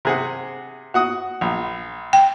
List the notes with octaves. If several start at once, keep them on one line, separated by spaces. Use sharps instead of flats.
C3 G#4 F#5
F#4 F#5 D#6
A#1
G5